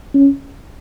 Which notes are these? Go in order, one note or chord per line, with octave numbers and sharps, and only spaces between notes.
C#4